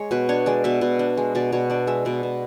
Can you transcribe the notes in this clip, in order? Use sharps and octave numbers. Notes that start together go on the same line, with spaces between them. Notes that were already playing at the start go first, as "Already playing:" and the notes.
Already playing: G#3 C#5
B2 B4
D4 C#5
G#3 D5
B2 E5
B2
D4
G#3
B2 D5
B2 C#5
D4 D5
G#3 E5
B2 D5
B2